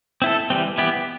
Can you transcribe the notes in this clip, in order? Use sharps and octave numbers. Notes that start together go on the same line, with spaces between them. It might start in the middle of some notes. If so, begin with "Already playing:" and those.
C4 E4 A4
E3 G3 C4
E3 B3 E4 G4